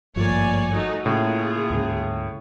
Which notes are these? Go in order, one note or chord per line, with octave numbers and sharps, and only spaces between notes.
G#1 G2 F3 A3 A#3 C#5 D5 G#5
A3 D#4 F#4
A2 C#3 A#3 F4 G#4
D2 G#2 C#3